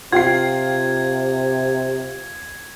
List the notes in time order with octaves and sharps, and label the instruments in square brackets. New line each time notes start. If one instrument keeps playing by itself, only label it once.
[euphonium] C3 [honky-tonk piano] F4 G5 C7 [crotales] G#6